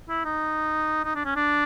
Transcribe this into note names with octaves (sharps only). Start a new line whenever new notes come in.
E4
D#4
D#4
D4
C#4
D4